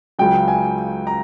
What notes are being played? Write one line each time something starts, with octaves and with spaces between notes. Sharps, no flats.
C#2 C#3 F#3 G5
G#5
A#5